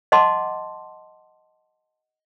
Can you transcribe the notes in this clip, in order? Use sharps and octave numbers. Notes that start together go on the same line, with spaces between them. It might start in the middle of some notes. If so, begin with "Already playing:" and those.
D#5 F#5 A5 C6 D6